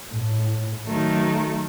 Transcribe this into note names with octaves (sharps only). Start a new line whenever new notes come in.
A2
D#3 F#3 A3